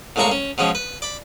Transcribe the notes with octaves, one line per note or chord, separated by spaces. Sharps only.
C2 A2 G#3 A#3 A#5 C#6
C#4
B2 F3 G#3 C#4
B4
D5 B5